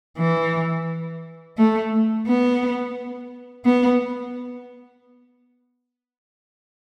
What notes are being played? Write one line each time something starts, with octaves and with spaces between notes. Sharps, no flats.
E3
A3
B3
B3